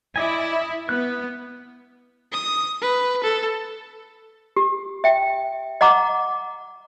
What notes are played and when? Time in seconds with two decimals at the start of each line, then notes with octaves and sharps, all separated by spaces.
0.16 E4 D5 D#5 G#5
0.89 B3 F#6
2.32 D#6
2.82 B4
3.24 A4
4.57 G4
5.04 E5 G5
5.81 D#5 F#5 A#5 D6